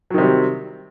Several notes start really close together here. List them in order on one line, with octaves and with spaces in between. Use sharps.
F#3 D#3 C3 G3